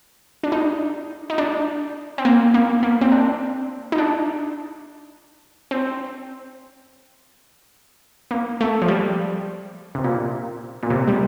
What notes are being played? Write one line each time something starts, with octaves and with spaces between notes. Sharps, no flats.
D4
D#4
D#4
D4
C4
A#3
A#3
A#3
C4
D4
D#4
D4
C4
A#3
A3
F3
G3
C3
A#2
A#2
C3
G3